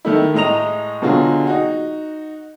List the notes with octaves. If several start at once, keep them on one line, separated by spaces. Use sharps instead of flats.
D#3 A3 E4
A2 G#3 D#5 A#5 F7
B2 D3 F#3 F4 F#4 G#4
D#4 F#4